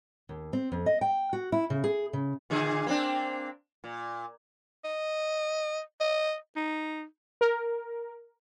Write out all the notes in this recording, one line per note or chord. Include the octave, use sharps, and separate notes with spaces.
D#2
C4
F2
D#5
G5
F#4
E4
C#3
G#4
C#3
A#2 D3 G#4
A#3 C4 D4
A#2
D#5
D#5
D#4
A#4